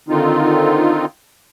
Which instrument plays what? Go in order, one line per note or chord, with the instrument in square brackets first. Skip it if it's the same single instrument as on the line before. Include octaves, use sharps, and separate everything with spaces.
[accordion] D3 D#3 C4 D#4 F4